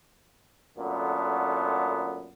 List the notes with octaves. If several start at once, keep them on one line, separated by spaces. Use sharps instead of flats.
F#2 A#2 D3 A3 B3